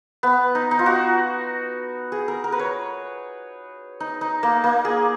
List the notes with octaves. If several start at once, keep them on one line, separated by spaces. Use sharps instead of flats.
B3
D#4
D#4
F4
F#4
G#4
A#4
A#4
B4
C#5
D#4
D#4
A#3
A#3
G#4